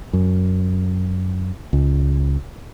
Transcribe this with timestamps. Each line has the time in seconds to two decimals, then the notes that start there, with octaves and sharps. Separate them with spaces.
0.13 F#2
1.73 C#2